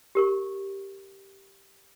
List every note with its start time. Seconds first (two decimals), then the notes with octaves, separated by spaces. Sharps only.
0.15 G4 A#4 C#6